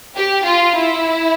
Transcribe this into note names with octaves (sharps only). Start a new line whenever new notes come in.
G4
F4
E4